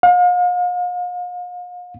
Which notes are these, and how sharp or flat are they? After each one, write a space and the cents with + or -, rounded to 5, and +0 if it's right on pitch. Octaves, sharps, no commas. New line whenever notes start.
F5 +40